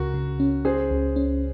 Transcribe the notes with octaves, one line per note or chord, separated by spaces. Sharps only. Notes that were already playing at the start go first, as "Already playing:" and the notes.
Already playing: C#2 C#3 F#4 A#4
C#3
C#4
C#4 G#4 C5
C#2
C#4